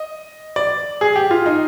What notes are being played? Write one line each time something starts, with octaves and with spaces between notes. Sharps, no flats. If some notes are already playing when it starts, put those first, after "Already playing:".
Already playing: D#5
D5
G#4
G4
F4
D#4